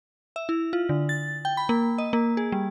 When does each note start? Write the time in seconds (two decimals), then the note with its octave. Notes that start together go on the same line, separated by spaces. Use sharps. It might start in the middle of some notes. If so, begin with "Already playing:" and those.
0.36 E5
0.49 E4
0.73 F4
0.89 D3
1.09 A6
1.45 G5
1.57 B5
1.69 A#3
1.98 D#5
2.13 A#3
2.37 G#4
2.52 G3